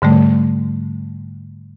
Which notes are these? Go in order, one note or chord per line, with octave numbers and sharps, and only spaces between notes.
G#2 D3 G3 A3